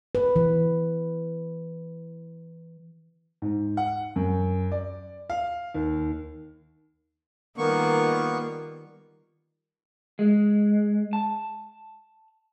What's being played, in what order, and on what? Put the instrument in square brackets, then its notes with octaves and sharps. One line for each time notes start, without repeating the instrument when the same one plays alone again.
[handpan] B4
E3
[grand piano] G#2
F#5
F#2
D5
F5
D#2
[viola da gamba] D#3 G3 F4 [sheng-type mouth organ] A#3 B3 C#6
[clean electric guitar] G#3
A5